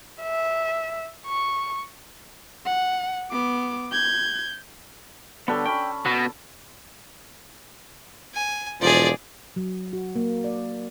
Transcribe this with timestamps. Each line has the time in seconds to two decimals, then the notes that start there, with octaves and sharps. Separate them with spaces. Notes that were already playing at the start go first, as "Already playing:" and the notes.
0.22 E5
1.26 C#6
2.66 F#5
3.32 B3 D6
3.92 G6 G#6
5.48 D3 G3 B3 D4 A4 C#5
5.66 C#4 D5 G5 B5
6.06 B2 F#4 B4
8.34 G#5
8.81 E1 F3 G#4 D5
9.56 F#3
9.93 F#4
10.16 A#3
10.44 D5